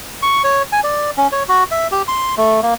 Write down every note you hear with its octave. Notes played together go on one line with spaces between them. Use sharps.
C#6
C#5
G#5
D5
C#4
C#5
F#4
E5
G4
C6
A3
A#3